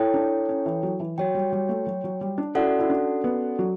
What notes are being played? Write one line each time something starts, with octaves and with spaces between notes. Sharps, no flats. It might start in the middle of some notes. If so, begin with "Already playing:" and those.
Already playing: E4 A4 C#5 G5
D4
C#4
E3
F#3
E3
F#3 F#4 C#5 G5
G3
G3
A3
F#3
F#3
G3
D4
C#4 E4 F#4 A4 D5 F#5
E4
D4
B3
F#3